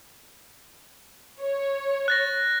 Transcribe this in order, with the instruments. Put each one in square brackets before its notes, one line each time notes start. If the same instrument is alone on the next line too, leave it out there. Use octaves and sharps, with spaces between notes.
[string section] C#5
[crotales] F#6 A6 A#6